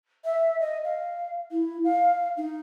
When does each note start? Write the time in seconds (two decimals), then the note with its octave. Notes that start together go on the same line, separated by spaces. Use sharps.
0.25 E5
0.60 D#5
0.84 F5
1.52 E4
1.84 F5
2.37 D#4